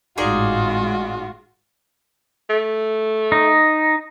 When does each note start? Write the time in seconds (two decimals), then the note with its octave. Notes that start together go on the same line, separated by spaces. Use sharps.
0.18 G#1 A2 G#3 D#4 F4 F#4 G#4 D5
2.50 A3
3.32 D#4